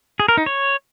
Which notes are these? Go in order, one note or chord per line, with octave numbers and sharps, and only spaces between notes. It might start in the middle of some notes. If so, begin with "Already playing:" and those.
G#4
A#4
D#4
C#5